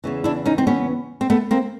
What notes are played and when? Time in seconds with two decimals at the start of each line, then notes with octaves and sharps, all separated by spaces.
0.04 E2 C#3 E3
0.24 D4 E4
0.46 C#4 D#4
0.58 C4
0.67 B3 C#4
1.21 C4
1.30 A3 B3
1.51 A#3 C4